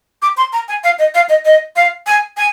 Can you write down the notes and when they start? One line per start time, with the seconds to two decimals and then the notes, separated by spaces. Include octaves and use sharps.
0.22 D6
0.37 C6
0.53 A#5
0.68 G#5
0.84 F5
0.99 D#5
1.14 F5
1.29 D#5
1.45 D#5
1.76 F5
2.07 G#5
2.37 G#5